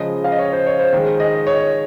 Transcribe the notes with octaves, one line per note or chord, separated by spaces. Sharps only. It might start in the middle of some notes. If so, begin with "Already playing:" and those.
Already playing: C#3 F3 G#3 D#5
F5
D#5
C#5
C5
C#5
C5
D#3 G#3
D#5
C#5